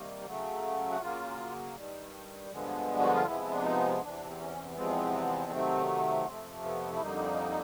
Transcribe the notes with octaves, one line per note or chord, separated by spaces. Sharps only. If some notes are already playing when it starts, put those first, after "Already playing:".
Already playing: C3 D#3 G3 A#3
C#3 F#3 A3
F#4
C#3 F#3 A#3 F4
G2 D#3 G3
G2 D3 F3 G#3 B3
F#4
F4
C3 F3 G#3 B3 E4
D4
D#4
E2 C3 E3 D4
C4
C#4
E2 C3 F3 G#3 B3 C4
C3 D#3 F#3 A3
F2 C3 F3 A3 C4
B3
E4
F2 D3 G3 A#3 D#4